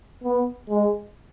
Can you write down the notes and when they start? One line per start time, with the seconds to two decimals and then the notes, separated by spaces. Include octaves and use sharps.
0.23 B3
0.69 G#3